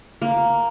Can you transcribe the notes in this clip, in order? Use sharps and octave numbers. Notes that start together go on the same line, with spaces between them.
A#3